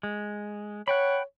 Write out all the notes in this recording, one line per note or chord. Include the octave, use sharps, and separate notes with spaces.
G#3
C#5 F#5 G5 B5